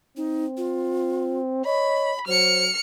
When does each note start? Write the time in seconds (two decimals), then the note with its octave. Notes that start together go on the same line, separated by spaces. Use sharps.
0.17 C4 D#4
0.57 F4
1.66 C#5 D#5 B5
2.28 F#3 C5 F6 C#7